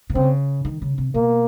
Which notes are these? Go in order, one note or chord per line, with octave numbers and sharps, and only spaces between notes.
C3
C#3 C4
D#3
C#3
C3
B2 A#3